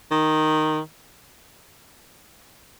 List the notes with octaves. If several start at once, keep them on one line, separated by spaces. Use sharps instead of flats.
D#3